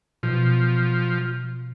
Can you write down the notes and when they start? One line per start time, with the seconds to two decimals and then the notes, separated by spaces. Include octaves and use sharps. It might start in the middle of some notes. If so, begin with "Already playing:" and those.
0.23 B2 F3